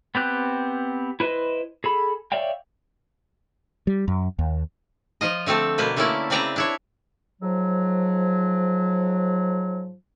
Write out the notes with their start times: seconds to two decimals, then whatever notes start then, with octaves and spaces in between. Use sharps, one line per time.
0.15 B3 C4 G4 F#6
1.20 E4 B4 C5 D#5
1.84 G#4 A4 B5
2.32 C#5 D5 E5 F5 G5
3.87 G3
4.08 F#2
4.39 D#2
5.21 F3 F4 D#5
5.46 D3 A3 C4 A4
5.78 B2 A#3 B4 C5
5.96 D3 A3 A#3 C#4 E4 D5
6.30 C#3 C4 B4 D5 E5 A#5
6.56 D4 E4 C#5
7.42 G#2 F3 F#3